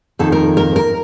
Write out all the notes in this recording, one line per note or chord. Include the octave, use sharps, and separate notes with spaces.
F2 D#3 A#3 D#4 A4
A#4
A#4
A#4